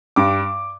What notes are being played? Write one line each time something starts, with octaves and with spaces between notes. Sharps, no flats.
G2 D6